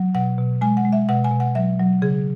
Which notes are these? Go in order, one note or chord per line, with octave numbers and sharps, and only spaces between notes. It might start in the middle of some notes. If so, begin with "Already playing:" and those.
Already playing: F#3
B2 F#5
B2
G#3 G#5
F#5
G#3
E5
B2 F#5
G#5
B2
F#5
F#3 E5
F#3
C#3 G#4